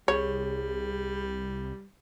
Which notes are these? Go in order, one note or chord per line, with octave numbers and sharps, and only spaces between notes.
C2 G3 G#4 C#5